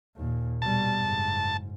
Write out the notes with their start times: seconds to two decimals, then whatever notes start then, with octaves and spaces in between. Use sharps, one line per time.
0.17 D#2 A#2
0.62 B2 G3 A5
0.97 F#1 G#2